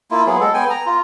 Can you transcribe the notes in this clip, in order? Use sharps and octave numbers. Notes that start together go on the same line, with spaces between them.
A#3 E4 F4
F#3 B3 G#4
G#3 A4
B3 G5 G#5
A#5
F4